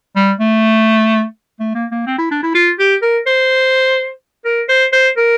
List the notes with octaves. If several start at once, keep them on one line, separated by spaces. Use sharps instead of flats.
G3
A3
A3
A#3
A#3
C4
E4
D4
E4
F4
G4
A#4
C5
A#4
C5
C5
A#4